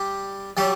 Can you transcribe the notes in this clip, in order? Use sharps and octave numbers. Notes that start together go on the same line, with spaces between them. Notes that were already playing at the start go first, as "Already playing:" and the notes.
Already playing: G3 G4
F#3 G3 G4